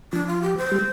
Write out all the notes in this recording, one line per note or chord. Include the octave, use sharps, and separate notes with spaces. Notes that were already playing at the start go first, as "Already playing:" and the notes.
F3 D4
F4
G4
C5
G3